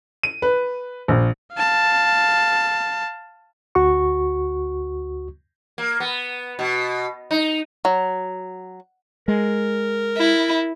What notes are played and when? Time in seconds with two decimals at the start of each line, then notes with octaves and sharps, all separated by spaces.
0.23 D#7
0.42 B4
1.08 A#1
1.54 F5 A5
3.75 D2 F#4 C#6
5.78 A#3
6.00 B3
6.59 B2
7.31 D#4
7.85 F#3
9.28 G#3 A#4
10.17 E4